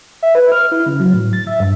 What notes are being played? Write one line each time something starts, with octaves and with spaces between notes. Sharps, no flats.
E5
B4
F6
E4
C#3
F#3
A2
A6
E5
G2